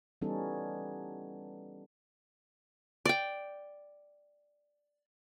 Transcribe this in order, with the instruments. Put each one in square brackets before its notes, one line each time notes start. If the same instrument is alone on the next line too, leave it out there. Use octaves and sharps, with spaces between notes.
[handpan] E3 G3 B3 C#4 D#4 A4
[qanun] D5 G5